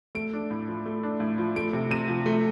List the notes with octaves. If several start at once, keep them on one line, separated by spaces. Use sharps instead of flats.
A3 D7
D4
A2
F3
A3
D4
A2
F3
A3 D7
C3
C3 D#7
F3
A3